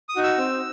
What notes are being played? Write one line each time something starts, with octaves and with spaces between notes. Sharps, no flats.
D#6
D#4 F#4
E6
C4